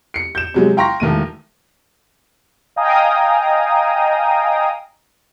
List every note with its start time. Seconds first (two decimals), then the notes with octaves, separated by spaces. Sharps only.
0.14 C7 C#7
0.35 G6 E7
0.54 C3 F#3 G#3
0.77 F5 G5 A#5 C6 C#6 A#6
1.00 E1 D#3 A3 D#7
2.76 D#5 F5 G5 G#5 A#5 D#6